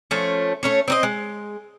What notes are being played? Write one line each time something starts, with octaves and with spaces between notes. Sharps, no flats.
F3 A3 C#4
A3 C#4 C#5
C4 D4 D#5
G#3